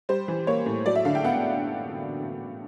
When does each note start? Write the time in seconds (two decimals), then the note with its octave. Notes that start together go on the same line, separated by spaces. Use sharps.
0.09 G3 C5
0.28 E3
0.47 A#3 C#5
0.66 A2
0.86 F#3 D5
0.95 E5
1.05 D3 F5
1.15 G5
1.24 B3 F#5